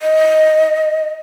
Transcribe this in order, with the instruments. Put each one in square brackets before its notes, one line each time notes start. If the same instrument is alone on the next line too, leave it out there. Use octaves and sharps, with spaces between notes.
[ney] D#5